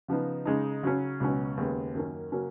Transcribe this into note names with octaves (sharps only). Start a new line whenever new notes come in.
C#3 F3 B3 D#4
C#3 G#3 D#4
C#3 F#3 C#4
C#2 B2 F#3 C#4
D#2 C#3 G#3 B3
F#2 D#3 A#3 C#4
C#3 F#3 A#3 C#4